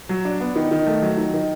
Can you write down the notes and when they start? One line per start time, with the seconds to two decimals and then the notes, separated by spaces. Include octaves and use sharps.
0.09 F#3
0.25 D4
0.40 B3
0.56 D#3
0.71 D#3
0.87 A3
1.02 F#3
1.17 D#3
1.34 D#3